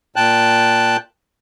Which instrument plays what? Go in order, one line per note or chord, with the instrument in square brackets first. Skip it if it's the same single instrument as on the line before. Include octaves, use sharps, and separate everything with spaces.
[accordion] A#2 G5 A5 F#6